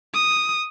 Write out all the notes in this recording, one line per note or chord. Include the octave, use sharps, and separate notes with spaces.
D#6